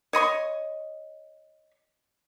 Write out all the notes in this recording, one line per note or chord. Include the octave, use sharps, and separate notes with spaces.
C#5 D#5 C6 C#6